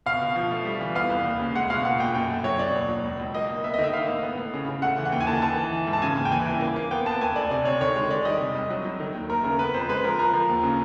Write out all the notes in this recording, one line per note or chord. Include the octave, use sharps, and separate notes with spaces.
B2 F5
B2
F3
A3
G3
E3
B3 F5
C2
D#2
C#3
G#3 F#5
B2 F5
A#2 F#5
A#2 G5
F#2 G5
A3
F#3 C#5
B2 D5
D#2
F#3
C#2
C#2
A#3 D#5
A#3
B3 E5
D#3 D#5
E5
A#3 F5
A2
B3
A2
C#3
C#3
A3 F#5
E3
F#5
D#2 G5
G#5
D#3 A5
E3 A5
E3
E3
G#2
A5
C#3 G#5
D#2
G5
E3 G#5
C2
A#3
A#3
B3 G5
B3 A5
D2 G#5
D2 D5
C3 D5
C3 C#5
D#3 C#5
G#3
D#3 D5
G3 D#5
C3
C2
F#3
F#3
D#3
D#2
A3 A#4
C#3 A#4
B3 B4
F2 C5
G#3 B4
F3 A#4
F3 A#4
F3
D#2
C#3